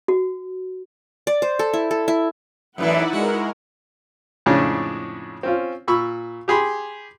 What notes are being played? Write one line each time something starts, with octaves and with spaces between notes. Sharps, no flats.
F#4
D5
C5
A4
E4
A4
E4
F#2 A2 E3 D#4 E4 B4 D5 F#5
G#3 F#4 A#4
F2 A2 C#3 G#3 C#4 D4
C4 C#4 F4
A#2 B5 C#6 E6
G4 G#4 B5 C6